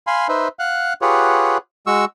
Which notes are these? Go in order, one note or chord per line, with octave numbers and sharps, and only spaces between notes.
F5 G#5 B5 C6
D#4 B4 C5 E5
F5 F#5 F#6
F4 G4 G#4 B4 C#5 F#5
G#3 F#4 C#6 E6